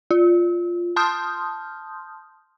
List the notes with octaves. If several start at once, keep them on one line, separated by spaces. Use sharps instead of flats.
F4
A5 C6 D#6 F6 G6